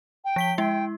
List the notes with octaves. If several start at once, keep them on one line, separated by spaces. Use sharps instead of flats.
G5
F3 B6 G7
G#3 E4 G5